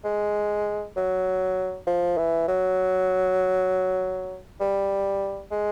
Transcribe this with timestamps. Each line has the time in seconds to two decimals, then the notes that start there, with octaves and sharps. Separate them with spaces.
0.04 G#3
0.96 F#3
1.87 F3
2.18 E3
2.48 F#3
4.61 G3
5.51 G#3